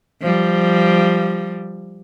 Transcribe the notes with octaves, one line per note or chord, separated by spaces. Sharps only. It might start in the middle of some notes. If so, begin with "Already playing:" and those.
F3 G3